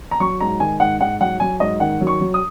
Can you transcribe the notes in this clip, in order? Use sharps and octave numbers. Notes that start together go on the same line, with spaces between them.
A#5
F#3 C#6
G#2 A#5
D#3 G#5
G#2 F#5
G#2 F#5
F#3 F#5
F#3 G#5
G#2 D#5
D#3 F#5
F#3
C#6
F#3
D#6